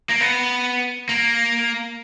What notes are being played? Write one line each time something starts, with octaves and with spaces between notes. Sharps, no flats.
A#3
B3
A#3